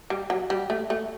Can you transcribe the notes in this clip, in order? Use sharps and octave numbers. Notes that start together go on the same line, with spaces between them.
G3
F#3
G3
A3
A3